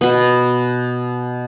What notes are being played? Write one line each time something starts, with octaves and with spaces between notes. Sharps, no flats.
B2 B3